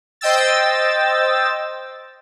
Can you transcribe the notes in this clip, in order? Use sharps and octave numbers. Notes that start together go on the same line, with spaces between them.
C5 D#5 G5 E6 A6